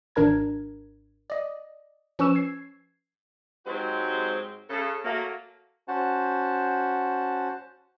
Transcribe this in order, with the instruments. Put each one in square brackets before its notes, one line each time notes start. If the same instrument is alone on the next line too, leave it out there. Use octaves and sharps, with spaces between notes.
[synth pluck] G#1 D4 A#4 A#5 G#6
D5 D#5
F3 C#4 B4 C#6 E6 E7
G#6 C7
[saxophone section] G#2 F#3 G#3 C4 G4 C5
C#3 A4
F#3 A3 A#3
[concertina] C#4 F#4 C5 F#5 A5